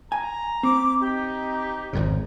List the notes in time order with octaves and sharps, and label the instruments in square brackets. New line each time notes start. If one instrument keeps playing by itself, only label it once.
[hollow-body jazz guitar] G#5 [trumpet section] A#5
[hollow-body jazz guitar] C4 [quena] D6
[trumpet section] D#4 [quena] G4
[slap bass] G#1 F2 C#3